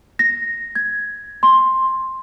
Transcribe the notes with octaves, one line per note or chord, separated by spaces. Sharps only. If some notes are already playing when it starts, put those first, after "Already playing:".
A#6
G#6
C6